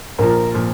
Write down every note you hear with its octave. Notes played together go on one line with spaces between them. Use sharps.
A#1 A#2 F3 A#4
A#2 F3